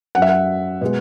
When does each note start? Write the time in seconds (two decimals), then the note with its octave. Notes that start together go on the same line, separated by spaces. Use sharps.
0.15 F#2 F#3 F#5
0.22 E5
0.29 F#5
0.81 B2 G#3